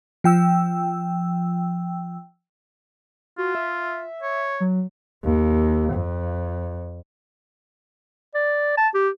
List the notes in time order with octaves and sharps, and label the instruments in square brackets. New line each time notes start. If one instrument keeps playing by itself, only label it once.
[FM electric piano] F3 G5 E6
[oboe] F4 [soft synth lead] F#4
[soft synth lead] E5
[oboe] C#5
[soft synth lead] F#3
[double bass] D#2
F2
[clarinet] D5
A5
G4